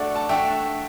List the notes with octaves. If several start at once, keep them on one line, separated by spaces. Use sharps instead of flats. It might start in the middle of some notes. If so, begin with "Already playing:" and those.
Already playing: A3 D4 F#4 D5 F#5
A5
A3 D4 F#4 E5 G5